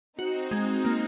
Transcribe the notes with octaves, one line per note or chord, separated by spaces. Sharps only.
C4 D#4 F#4
G#3
A#3